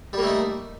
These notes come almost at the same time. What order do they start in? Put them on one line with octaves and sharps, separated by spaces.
G3 A#3 A3 D#4